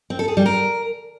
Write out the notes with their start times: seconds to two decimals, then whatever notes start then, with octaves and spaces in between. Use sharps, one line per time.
0.10 C4
0.19 A4
0.28 G#4
0.37 G3
0.46 A#4